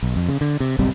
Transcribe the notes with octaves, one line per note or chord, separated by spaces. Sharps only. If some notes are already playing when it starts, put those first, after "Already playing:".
B1
F2
C#3
D3
C3
F#1 B1 G3 C4